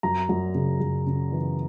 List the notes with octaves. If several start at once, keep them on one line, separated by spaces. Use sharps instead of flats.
F#2 A#5
F#2
C#3
F#2
C#3
E3